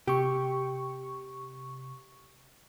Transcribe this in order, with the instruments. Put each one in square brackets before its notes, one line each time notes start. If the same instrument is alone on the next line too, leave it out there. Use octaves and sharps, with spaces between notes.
[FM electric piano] C3 C#6 [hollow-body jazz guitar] G4